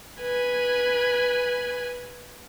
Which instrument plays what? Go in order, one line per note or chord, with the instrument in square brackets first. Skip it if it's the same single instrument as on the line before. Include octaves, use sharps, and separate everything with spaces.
[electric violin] B4 G#5